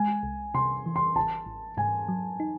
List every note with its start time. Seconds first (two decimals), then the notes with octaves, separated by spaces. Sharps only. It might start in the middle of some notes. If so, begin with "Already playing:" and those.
Already playing: G#3 G#5
0.23 C2
0.54 C3 C6
0.86 E3
0.96 C6
1.15 G#1 A5
1.46 G#1
1.77 G#2 G#5
2.08 F#3
2.40 D#4